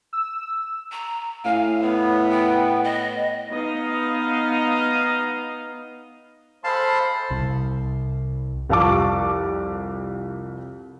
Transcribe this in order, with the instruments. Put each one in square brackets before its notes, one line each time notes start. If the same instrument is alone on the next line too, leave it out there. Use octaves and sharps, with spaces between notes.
[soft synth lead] E6
[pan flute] A#5
[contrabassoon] A2 [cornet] F5 [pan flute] G#5
[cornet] B3 [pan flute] C#5
[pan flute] G5
D#5
[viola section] B3 D#4 D#5 F5
[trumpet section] G#3 A4 B5 [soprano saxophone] C5 [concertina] F5 A5
[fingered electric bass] C2 C3
[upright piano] C2 F2 F5 A5 C#6 D6